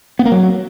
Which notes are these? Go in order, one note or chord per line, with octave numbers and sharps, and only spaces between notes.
B3
A#3
F#3